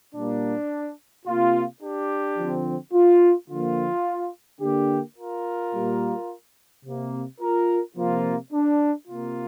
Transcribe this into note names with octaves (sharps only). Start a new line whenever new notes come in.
A#2 G3 A#3 D4
C3 A#3 F4
D4 G4
D3 F3 C4
F4
D3 F3 A#3 F4
D3 A#3 D4 G4
F4 A#4
A#2 G3 A#3
C3 A#3
F4 A#4
C3 F3 A#3 F4
D4
C3 A#3 F4